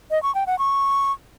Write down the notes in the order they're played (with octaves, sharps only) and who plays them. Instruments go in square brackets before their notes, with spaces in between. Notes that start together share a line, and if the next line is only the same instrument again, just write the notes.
[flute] D#5
C#6
G5
F#5
C#6